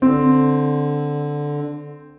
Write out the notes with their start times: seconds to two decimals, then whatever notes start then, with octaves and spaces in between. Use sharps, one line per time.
0.02 D3 C4